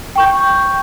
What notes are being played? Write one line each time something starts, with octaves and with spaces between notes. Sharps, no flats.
G5 C#6 G6